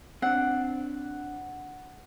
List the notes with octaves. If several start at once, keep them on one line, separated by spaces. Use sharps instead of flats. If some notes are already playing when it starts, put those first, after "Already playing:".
C4 D4 F#5